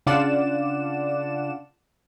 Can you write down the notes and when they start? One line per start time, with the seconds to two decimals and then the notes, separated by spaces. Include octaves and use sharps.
0.06 C#3 D4 F4 D5 F#5 E7